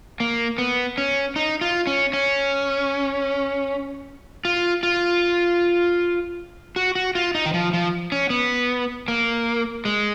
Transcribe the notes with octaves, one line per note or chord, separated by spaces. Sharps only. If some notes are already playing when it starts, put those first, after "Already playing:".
A#3
B3
C#4
D#4
F4
C#4
C#4
F4
F4
F#4
F#4
F4
D#4
D#3
F3
F3
C#4
B3
A#3
G#3